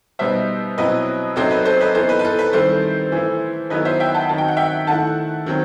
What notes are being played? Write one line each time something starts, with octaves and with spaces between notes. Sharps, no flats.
B2 G3 B3 D#4 C5 E5
B2 F#3 C4 E4 B4 D#5
C3 F#3 C4 D#4 A4 C5
B4
A4 C5
B4 D#5
E3 B3 D#4 A4 C5
B4
B4
A4
B4
D#3 G3 C4 E4 A4 C5
E3 A3 E4
D#3 F#3 B3 E4 B4 D#5
C5 E5
E5 G5
F#5 A5
D#3 F#3 C4 D#4 A5
G5
F#5
E5 G5
D#3 A3 E4 F#5 A5
D#3 F#3 C4